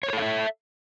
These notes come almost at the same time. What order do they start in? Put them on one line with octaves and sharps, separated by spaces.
C#5 A#4 A4 F5 E5